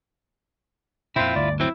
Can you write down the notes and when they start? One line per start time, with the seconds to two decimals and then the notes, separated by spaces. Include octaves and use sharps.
1.16 F2 A#2 C4 E4 F4
1.36 G1 D2 D5
1.60 F#3 C4 E4